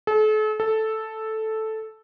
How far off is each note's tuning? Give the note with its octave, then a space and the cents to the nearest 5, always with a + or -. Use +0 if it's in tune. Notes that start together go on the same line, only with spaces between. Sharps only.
A4 -40
A4 -5